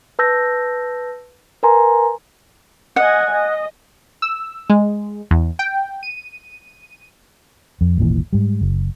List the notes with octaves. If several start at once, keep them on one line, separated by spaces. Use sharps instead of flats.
B4 A5 E6 G6 A#6
A#4 B4 G#5 A#5 C6
D#5 F#5 G#5
D#5
E6
G#3
E2
G5
D#7
F2
D#1 G#1 A#2 E3
G#2 G3
F#1